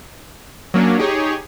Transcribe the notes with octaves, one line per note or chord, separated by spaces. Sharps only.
F#3 A#3 C#4 D4
D#4 G4 G#4 C#5